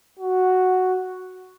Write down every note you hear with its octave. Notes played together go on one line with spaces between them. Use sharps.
F#4